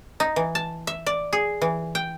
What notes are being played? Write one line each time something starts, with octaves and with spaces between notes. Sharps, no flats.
D#4
E3
A5
E5
D5
G#4
E3
G5